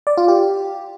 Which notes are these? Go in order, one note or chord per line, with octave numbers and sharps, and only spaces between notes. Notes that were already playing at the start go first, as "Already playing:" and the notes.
D5
F4
G4